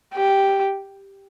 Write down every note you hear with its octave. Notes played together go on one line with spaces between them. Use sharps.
G4